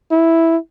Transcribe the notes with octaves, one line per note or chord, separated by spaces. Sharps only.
E4